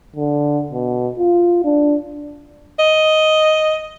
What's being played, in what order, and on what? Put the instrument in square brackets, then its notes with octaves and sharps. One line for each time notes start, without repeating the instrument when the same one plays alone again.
[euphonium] D3
B2
F4
D4
[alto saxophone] D#5